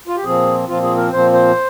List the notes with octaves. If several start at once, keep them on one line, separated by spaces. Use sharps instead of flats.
F4
G4
A#2 F3 C4 G#4
A#2 F3 C4 F4
G#4
A#4
A#2 F3 C4 C5
C5